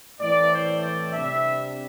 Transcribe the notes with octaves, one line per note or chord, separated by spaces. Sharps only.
A2 E3 A3 C4 D5
C5
D5
C3 G3 D4 E5